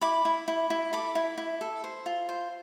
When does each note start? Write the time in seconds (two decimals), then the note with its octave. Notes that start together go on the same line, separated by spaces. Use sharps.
0.01 E4 B5 D6
0.25 E4
0.48 E4
0.70 E4
0.93 A4 B5 D6
1.15 E4
1.38 E4
1.61 A4
1.84 C5
2.06 F4
2.29 C5